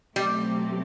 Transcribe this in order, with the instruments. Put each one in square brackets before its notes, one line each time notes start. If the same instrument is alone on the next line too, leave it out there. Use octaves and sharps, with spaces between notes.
[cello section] B2 F#3 A3 C4 G4 [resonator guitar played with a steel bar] G3